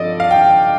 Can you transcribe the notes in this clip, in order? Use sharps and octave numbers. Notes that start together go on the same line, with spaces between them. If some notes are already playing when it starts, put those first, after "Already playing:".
Already playing: G2 F3 C4 D#4 A4 D5 D#5
F5
G5